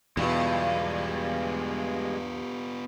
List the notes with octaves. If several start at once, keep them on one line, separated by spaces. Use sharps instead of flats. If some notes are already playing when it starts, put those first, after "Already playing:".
E2 G2 B2 G3 G#3 B3 F4